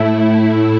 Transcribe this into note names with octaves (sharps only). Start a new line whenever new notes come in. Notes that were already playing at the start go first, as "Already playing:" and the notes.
Already playing: A2 A3 E4